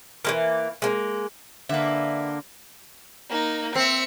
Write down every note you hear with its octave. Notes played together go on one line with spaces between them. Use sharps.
E3 G#3 A#3
G#3 A#3
D3 A#3 B4 E5
A#3 D#4
C4 E5 C#7